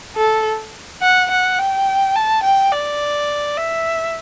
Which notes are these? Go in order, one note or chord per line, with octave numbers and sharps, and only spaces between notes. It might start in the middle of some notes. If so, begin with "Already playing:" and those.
A4
F#5
F#5
G5
A5
G5
D5
E5